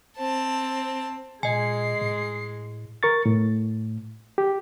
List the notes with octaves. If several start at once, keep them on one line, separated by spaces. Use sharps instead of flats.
C4 A5
A#2 G#3 D#5 G#5 C7
A2
A#4 C#6 A6
A2
G4